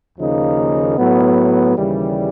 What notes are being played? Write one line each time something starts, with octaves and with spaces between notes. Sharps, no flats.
D#2 C#3 F3 A#3 D#4
A2 F#3 B3
D#2 C#3 E3 G3